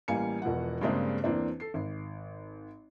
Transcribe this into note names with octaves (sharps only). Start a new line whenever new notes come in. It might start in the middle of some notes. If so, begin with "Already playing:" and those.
A1 G3 A#3 F5 G#5 C#7
E1 B2 F3 F#5
G2 C#3 G#3 A#3 C4 D4
E2 A#3 C4 D4
A4 C7
G#1